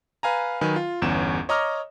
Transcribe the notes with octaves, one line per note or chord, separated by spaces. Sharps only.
B4 F5 G#5 A#5
D#3 F#3 B4 G#5
F4
G1 E2 C#4 E7
C#5 D#5 A#5 D6 F6